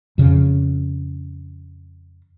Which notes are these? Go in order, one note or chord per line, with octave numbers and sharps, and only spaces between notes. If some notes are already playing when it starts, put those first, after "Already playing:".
F2 C#3